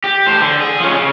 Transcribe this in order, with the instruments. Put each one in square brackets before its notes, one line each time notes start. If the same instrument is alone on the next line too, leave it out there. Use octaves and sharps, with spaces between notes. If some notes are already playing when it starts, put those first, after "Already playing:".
[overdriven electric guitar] G4
A2 C5
D3
G#4
F3 C#4
C#3